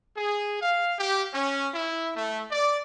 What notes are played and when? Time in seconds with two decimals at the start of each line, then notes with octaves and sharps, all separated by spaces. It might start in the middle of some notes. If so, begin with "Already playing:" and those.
0.17 G#4
0.62 F5
0.97 G4
1.33 C#4
1.72 E4
2.16 A3
2.51 D5